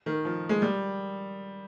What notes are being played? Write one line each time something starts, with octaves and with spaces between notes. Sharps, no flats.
D#3
F3
G#3
G3